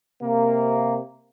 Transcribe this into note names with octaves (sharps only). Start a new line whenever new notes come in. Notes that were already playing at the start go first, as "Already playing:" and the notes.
C3 A#3